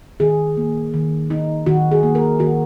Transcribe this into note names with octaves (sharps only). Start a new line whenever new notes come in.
D#3 G#4
A#3
D#3
D#4
D#3 F#4
G#4
A#3
A#4
D#3 F#4